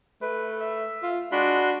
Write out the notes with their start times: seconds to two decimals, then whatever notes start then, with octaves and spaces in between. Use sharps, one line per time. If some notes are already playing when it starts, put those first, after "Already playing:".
0.22 A3 B4
0.60 E5
1.03 F4
1.32 G#3 D4 F#4 B5 C6